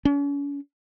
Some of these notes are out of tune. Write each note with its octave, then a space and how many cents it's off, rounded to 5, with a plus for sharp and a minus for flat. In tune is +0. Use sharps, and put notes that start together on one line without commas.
C#4 +40